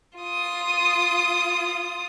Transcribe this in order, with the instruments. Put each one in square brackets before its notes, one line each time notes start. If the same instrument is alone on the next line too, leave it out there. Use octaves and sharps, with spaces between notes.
[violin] F4 D#6